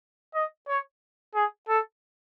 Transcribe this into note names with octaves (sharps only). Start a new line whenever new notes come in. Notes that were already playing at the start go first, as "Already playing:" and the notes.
D#5
C#5
G#4
A4